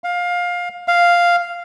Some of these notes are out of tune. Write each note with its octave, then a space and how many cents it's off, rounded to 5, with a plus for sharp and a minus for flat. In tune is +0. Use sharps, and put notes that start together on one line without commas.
F5 +20
F5 +0